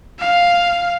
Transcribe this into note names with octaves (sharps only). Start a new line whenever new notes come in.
F5